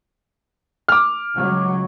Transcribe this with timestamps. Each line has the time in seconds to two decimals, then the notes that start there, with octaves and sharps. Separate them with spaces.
0.88 D6 F6
1.35 C#2 F#3